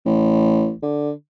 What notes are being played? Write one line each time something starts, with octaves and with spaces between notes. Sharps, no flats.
A1
D3